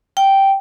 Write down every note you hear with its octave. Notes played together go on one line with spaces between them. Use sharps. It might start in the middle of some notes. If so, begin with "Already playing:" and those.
G5